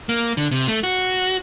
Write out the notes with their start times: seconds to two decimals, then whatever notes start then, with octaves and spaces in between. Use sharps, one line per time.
0.09 A#3
0.37 D3
0.51 C3
0.68 A3
0.83 F#4